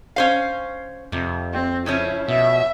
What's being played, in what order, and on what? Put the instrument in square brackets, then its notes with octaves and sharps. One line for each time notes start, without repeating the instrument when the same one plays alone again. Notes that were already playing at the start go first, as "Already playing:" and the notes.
[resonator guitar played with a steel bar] C#4 C5 F5
[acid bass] F2 [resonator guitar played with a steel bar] C3
[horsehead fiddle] C4
[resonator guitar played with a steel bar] C#3 F3 C#4 [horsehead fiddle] E4
[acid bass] B2 [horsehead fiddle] E5